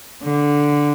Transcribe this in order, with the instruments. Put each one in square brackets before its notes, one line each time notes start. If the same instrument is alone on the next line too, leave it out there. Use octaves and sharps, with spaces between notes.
[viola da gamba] D3